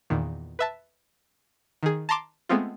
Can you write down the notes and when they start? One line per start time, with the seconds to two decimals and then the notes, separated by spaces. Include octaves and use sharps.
0.10 E2 A#2 D#3
0.59 B4 E5 A5
1.83 D#3 G#4
2.09 A5 A#5 C6 D6
2.49 G#3 A3 B3 C4 F4